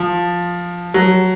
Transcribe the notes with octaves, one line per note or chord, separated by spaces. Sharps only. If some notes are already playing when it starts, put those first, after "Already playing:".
Already playing: F3
F#3